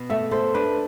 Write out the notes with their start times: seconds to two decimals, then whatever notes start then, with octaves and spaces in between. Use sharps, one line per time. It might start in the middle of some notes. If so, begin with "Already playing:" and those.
Already playing: B2
0.10 A3 E5
0.31 A4 C5
0.54 D4 B4